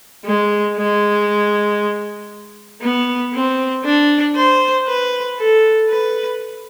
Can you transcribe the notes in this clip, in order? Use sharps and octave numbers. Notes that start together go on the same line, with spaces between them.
G#3
G#3
B3
C4
D4
C5
B4
A4
B4